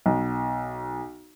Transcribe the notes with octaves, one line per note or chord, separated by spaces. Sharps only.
B1